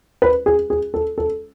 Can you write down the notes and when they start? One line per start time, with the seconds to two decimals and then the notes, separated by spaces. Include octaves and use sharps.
0.22 B4
0.46 G#4
0.70 G#4
0.94 A4
1.18 A4